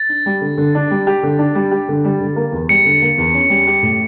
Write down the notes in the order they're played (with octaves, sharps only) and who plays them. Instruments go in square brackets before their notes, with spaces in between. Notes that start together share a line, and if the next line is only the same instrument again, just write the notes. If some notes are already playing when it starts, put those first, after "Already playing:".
Already playing: [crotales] A6
[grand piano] D4
G3
D3
D3
D4
G3
G4
D3
D4
G3
G4
D3
G3
D3
A#3
E2
[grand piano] G3 [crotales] C#7
[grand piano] D3
A#3
E2
C#4
G3
G4
A2